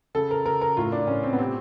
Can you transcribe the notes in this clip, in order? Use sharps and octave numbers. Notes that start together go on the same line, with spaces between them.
C#3 A4
A#4
C#3 A#4
A#4
A2 F4
D4
A2 C#4
C4
B3
C3 C4